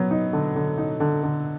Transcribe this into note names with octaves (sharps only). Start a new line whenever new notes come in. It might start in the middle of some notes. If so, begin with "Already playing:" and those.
Already playing: F#3 B3
D#4
D3
D3
D#4
D3
D3